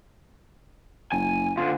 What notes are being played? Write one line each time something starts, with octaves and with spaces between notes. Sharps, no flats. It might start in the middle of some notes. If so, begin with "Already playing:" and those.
F#1 G#5
D2 D3 F4